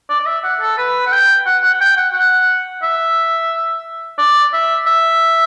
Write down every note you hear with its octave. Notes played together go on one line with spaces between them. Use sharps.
D5
D5
E5
F#5
A4
B4
F#5
G5
F#5
F#5
F#5
G5
F#5
F#5
E5
D5
E5
E5